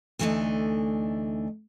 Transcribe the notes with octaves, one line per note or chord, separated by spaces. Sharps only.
D2 E3 A3 D4 D#4 D#5